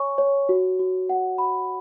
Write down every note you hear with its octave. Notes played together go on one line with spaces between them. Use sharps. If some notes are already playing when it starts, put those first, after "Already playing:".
Already playing: C#5 G#5 C#6
C#5
F#4
F#4
F#5
B5